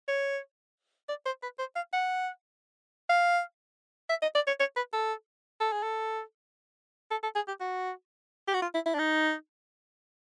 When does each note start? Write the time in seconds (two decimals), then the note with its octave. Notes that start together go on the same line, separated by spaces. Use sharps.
0.08 C#5
1.09 D5
1.26 C5
1.43 B4
1.59 C5
1.76 F5
1.93 F#5
3.09 F5
4.09 E5
4.22 D#5
4.35 D5
4.47 C#5
4.60 C#5
4.76 B4
4.93 A4
5.61 A4
5.72 G#4
5.83 A4
7.11 A4
7.23 A4
7.35 G#4
7.48 G4
7.61 F#4
8.48 G4
8.54 F#4
8.62 F4
8.74 E4
8.86 E4
8.94 D4
8.99 D#4